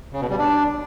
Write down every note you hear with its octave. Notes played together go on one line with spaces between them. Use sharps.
C#3
B2
G3
D4